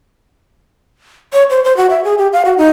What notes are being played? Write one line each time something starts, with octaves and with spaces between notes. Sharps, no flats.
C#5
C5
C5
F#4
E5
G#4
G4
F5
F#4
D#4